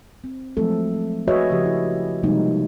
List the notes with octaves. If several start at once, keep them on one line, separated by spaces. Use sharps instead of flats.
C4
F3 F#3 G#3 A3 C4 A4
F#4 G#4 B4 C#5 D#5 E5
C#3 F3 G4
E4
C3 F3 G3 G#3 A#3 D#4